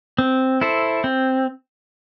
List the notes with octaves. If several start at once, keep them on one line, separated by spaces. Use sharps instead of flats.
C4
E4 A4 C5
C4